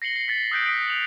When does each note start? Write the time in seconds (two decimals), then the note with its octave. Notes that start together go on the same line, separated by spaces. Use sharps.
0.02 A#6 C7 C#7 F#7 G7
0.16 C7
0.28 A6 B6
0.51 D#6 E6 F#6 G6 B6 D7
0.64 D#6 B6 D7 F#7
0.88 F7 F#7